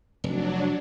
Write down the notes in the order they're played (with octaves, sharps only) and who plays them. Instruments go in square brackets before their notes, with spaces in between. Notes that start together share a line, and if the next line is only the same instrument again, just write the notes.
[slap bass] F1 [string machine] F#3 D4